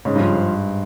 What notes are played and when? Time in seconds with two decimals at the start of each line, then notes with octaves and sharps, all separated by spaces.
0.05 G#2 C#3
0.16 G2
0.20 F3